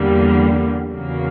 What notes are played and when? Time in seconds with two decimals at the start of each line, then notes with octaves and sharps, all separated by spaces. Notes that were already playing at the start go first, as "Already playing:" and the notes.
Already playing: E2 D3 G3 A#3
0.93 E2 C#3 F#3 A#3